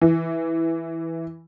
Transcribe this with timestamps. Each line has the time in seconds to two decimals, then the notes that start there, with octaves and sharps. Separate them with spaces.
0.02 E3